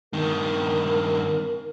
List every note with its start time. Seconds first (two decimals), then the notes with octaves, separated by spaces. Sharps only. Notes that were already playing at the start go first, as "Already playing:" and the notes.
0.13 G2 D#3 A#4